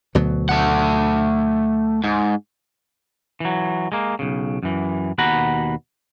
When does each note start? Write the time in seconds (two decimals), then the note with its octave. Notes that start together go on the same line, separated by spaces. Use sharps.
0.15 D2 B2 F#3
0.49 A3 F#5
2.04 G#2
3.40 E3 F#3
3.92 G#3 A#3
4.19 B1 C#3
4.63 F#2 E3
5.18 D#2 B2 F#4 F#5 A#5 B5